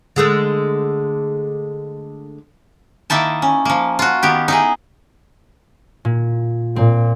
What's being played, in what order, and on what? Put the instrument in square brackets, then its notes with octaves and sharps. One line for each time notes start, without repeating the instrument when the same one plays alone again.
[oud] D3 G#3 A3
[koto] D#3 A#3 D#4 E4 A5
C#4
F3 A#3
F4 F#4
D#3 B3 G4
D#4 E4 G#4
[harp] A#2
[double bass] A#2 [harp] C4